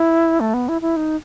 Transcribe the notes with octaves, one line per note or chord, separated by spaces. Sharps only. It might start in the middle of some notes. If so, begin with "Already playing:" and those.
Already playing: E4
A3
B3
E4
E4
D#4